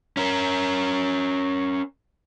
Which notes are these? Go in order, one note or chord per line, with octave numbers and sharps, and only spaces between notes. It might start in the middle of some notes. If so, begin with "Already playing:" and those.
C#4 A#4